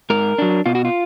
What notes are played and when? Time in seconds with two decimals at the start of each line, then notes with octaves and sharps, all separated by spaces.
0.10 G#2 A#4
0.38 F#3 D4
0.66 B2 F4
0.75 F#4
0.85 F4